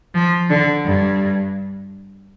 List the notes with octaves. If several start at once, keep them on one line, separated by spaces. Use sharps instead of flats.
F3
D3
G2